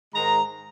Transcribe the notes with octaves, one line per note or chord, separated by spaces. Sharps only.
G#2 D#3 G#3 A#5